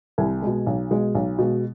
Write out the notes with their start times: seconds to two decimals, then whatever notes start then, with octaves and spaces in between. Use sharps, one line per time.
0.18 C2 G#5
0.42 B2 G#3
0.66 B1
0.91 B2 G#3
1.15 B1
1.38 B2 G#3